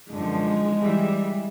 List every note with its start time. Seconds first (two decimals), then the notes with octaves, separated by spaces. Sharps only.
0.12 F#2 D3 F3 G#3
0.84 E3 G3 E5